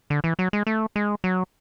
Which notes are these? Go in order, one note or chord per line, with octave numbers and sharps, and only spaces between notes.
D3
E3
F#3
G#3
A3
G#3
F#3